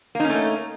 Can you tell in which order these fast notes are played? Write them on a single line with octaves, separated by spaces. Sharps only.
A#3 D#4 C#4 A3